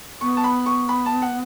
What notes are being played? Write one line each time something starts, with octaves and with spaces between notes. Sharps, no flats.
B3 C#6
A5
B5
C#6
B5
A5
F#5